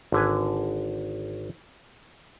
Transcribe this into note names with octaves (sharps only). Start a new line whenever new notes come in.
G#1 D3 B4 G#5